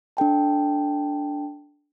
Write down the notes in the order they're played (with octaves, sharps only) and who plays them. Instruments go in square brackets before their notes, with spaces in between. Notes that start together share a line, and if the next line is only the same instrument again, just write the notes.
[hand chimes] D4 A4 G5 A5